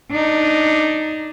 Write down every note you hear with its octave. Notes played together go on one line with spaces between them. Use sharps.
D4 D#4